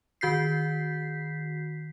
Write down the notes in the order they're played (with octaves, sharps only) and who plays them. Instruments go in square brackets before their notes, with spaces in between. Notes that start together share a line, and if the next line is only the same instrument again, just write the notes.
[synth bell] D#3 F#4 G6 B6 C7